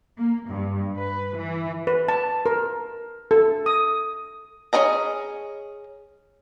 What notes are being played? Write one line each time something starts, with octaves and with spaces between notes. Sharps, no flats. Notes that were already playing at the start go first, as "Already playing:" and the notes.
A#3
G2
B4
E3
B4
A5
A#4
A4
D#6
C#4 E4 G#4 D#5 A#5